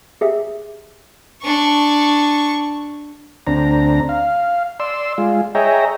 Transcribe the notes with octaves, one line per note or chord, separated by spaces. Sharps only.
G4 G#4 E5
D4 C#6
D2 C4 D4 A#5
F5
D5 C6 E6
G#3 F4
G#4 C#5 D#5 E5 G5 A#5